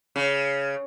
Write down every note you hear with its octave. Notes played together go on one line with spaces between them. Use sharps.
C#3